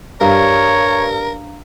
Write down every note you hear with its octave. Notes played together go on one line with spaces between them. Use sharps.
G2 D4 A#4 C#5 F5 A#5